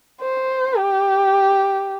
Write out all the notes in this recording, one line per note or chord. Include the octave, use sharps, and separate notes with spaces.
C5
G4